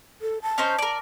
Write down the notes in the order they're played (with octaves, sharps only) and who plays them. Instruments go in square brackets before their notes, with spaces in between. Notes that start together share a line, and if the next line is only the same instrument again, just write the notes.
[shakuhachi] A4
A5
[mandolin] C#4 D#4 C5
A#4 D5